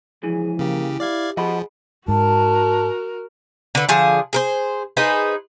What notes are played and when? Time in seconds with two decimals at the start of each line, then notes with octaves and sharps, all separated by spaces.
0.23 C#2 E3 F3 G#4
0.59 C#3 A#3 G4
1.00 E4 G4 D5 F5 G#6
1.37 F3 G#4 D#5 F#5 B5
2.08 G#2 F#4 A#4 A5
3.75 D3 B4
3.89 D3 F3 G#4
4.33 G#4 A#4 C5
4.97 D#4 G#4 B4 C5